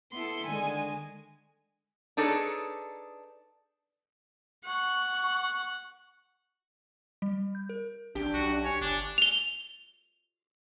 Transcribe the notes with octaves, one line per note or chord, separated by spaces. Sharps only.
B3 E4 A4 C6
D3 D#3 G#3 G#5
D4 D#4 G#4 A4 B4 C#5
F#5 C#6
G3
G6
A#4
A1 D4 G4
B1 F#4
D4
C#5 G#5
G1 D4
F7 G7